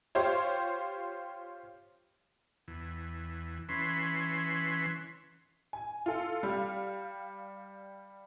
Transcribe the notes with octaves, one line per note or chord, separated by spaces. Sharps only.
F4 G4 C5 C#5
E2
E3 C#4 B4 C6
G#5
F4 A4
G3 F5 F6